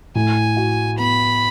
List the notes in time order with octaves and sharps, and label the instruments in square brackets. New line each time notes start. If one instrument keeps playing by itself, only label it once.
[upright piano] A2 [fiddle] G#5
[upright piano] F#4
[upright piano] B3 [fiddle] B5